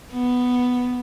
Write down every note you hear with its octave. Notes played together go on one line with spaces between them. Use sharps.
B3